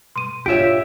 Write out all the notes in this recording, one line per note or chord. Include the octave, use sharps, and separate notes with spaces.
B2 C6 D#7
G#2 D4 F4 G4 C#5 E5 D7 E7